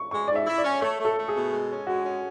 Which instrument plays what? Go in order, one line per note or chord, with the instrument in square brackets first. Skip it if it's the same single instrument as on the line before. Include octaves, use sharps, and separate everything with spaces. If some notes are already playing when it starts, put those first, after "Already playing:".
Already playing: [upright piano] C#6
[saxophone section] G#3 [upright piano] C#6
[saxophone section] G#2 [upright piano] D5
[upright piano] E5
[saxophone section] E4
[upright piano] D5
[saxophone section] C#4
[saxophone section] A3 [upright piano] C#5
[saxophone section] A3
[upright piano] A4
[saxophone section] A3
[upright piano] G#4
[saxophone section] B2
G#3
C#4
[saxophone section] G#3 [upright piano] F#4
[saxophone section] C#4